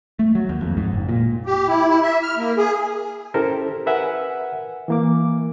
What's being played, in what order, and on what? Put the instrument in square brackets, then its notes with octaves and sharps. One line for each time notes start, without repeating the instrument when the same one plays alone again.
[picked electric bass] A3
F#3
D#2
F2
G#2
F#1
A#2
[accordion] G4
E4
E4
E5
F6
A#3
G#4
[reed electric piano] C#4 E4 G4 A4 A#4 C5
A#4 B4 E5 F#5 G#5
E3 A#3 D6